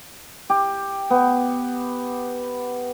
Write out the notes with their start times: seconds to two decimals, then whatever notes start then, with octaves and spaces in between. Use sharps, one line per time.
0.50 G4
1.10 B3